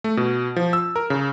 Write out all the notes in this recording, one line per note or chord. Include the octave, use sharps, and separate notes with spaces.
A3
B2
F3
E6
A#4
C#3